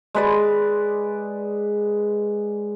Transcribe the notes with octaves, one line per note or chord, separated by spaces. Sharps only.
G#3 B4 D5